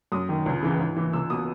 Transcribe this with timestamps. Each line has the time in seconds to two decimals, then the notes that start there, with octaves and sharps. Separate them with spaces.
0.12 F#2 D#6
0.29 D#3
0.46 C#2
0.62 C#3 E3
0.79 G#2
0.96 E3
1.13 C#2 E6
1.30 B2 D#6